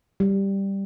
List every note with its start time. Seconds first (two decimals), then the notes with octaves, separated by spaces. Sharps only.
0.20 G3